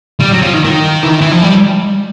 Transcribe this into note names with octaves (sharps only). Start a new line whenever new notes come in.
G3
F#3
F3
D#3
D#3
E3
D#3
E3
F3
G3